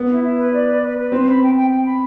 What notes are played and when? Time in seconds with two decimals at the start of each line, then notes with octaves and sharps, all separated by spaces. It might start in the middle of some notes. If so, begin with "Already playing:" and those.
Already playing: B3
0.09 E4
0.23 E4
0.38 B4
0.53 D5
0.68 B4
0.82 B4
0.97 B4
1.11 C4 C5
1.27 B5
1.41 G5
1.55 G5
1.70 G5
1.85 B5